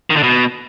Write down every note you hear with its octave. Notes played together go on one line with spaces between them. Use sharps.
D#3
D3
B2